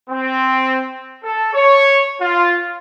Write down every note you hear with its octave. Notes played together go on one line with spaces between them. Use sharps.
C4
A4
C#5
F4